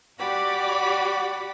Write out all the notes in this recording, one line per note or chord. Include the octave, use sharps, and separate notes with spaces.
F#4 G4 D5 F#5 B5